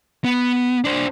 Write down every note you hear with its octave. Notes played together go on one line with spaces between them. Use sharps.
B3
D4 C5